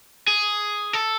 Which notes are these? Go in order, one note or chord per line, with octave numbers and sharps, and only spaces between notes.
G#4
A4